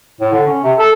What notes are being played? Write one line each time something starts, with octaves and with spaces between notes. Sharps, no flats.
A2
D3
C#4
C3
A4